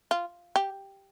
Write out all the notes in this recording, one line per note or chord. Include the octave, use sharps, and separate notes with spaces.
F4
G4